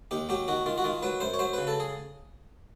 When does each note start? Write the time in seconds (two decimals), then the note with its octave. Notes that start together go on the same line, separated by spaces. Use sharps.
0.11 D#2 G4
0.29 F#3 G4
0.48 D#3 F#4
0.66 D#3 F4
0.78 F#4
0.84 D#3 F4
1.02 F#3 B4
1.20 F#2 C5
1.34 C#5
1.39 F#3 C5
1.53 C#3 B4
1.67 A4
1.80 G#4